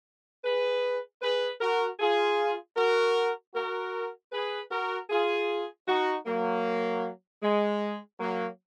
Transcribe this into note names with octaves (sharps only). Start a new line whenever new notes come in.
G#4 B4
G#4 B4
F#4 A#4
F4 G#4
F#4 A#4
F#4 A#4
G#4 B4
F#4 A#4
F4 G#4
D#4 F#4
F#3 A#3
G#3
F#3 A#3